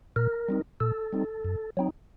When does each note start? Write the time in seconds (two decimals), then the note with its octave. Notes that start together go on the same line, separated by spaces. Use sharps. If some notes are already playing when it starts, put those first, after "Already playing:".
0.16 A#2 A#4
0.48 G3 C4 D#4
0.80 A#2 A4
1.13 G3 C4 D#4
1.45 F#2
1.77 F#3 C4 D#4